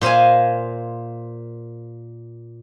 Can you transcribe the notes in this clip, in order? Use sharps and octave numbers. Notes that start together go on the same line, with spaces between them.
A#2 C5 D#5 F5 G#5